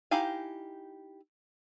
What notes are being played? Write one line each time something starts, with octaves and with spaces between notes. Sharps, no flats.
D#4 E4 G4 F5 G#5